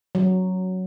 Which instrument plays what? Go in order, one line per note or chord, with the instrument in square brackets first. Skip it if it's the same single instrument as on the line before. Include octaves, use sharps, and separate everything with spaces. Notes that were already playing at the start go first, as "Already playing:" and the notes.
[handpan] F#3